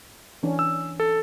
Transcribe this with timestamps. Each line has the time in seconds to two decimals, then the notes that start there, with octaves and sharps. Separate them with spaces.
0.43 E3 C#4 D4
0.59 E6
1.00 A4